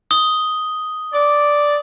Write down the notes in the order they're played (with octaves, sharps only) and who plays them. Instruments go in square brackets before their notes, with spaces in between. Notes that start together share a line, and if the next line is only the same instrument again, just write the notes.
[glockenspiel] D#6 G7
[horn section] D5